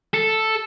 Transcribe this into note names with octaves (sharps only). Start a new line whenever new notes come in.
A4